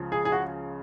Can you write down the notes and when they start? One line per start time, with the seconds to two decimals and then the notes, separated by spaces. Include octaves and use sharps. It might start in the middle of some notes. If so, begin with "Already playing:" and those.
Already playing: C#2 C#3 F3
0.12 G#4
0.25 G#4
0.32 F#4